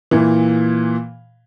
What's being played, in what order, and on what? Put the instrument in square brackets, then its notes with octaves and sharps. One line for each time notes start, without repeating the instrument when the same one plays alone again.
[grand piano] A#2 E3